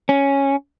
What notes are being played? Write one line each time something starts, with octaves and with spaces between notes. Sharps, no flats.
C#4